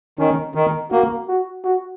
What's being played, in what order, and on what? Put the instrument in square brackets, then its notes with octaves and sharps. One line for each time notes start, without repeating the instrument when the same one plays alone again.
[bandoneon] D#3 [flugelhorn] C#4
[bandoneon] D#3 [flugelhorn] D#4
[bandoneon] A#3 [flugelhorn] F#4
[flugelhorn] F#4
F#4